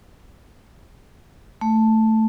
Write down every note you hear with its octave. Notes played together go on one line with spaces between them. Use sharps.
A3